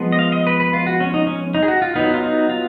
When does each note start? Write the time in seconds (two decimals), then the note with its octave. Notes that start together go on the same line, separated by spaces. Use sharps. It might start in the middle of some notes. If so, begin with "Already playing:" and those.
Already playing: F3 G#3 B3
0.12 D#5
0.19 F5
0.32 D#5
0.47 B4
0.60 B4
0.73 F4
0.87 F#4
1.00 C#4
1.14 D#4
1.27 C#4
1.55 D#4
1.63 G#4
1.68 F#4
1.82 F4
1.96 F#3 B3 D#4
2.14 F4
2.22 D#4
2.49 F4